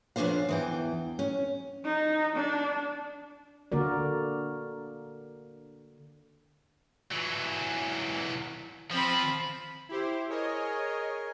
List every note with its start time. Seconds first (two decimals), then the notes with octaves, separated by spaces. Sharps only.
0.16 F2 B3 C#4 D4 C5 F5
0.49 E2 E3 G5
1.19 C#4
1.85 D#4
2.36 D4
3.72 D3 A#3 F#4 A#4 D5
7.11 E3 F#3
8.92 F3 C4 B5
9.89 E4 G4 C5
10.30 G#4 A#4 C#5 D#5